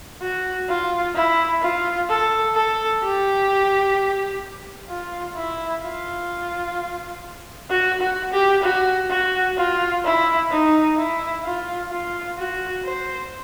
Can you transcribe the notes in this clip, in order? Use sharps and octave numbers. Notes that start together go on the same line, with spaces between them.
F#4
F4
E4
F4
A4
A4
G4
F4
E4
F4
F#4
F#4
G4
F#4
F#4
F4
E4
D#4
E4
F4
F4
F#4
C5